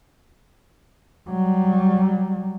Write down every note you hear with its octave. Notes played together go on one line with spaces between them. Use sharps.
F#3 G3